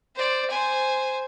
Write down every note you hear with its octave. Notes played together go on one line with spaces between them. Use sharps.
C5 D5
C5 G#5